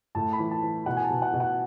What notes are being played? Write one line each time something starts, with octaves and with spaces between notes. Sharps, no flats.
A2 A5
B5
E3
A5
E3
B2 F#5
G#5
A5
B2
F#5
B2
F#5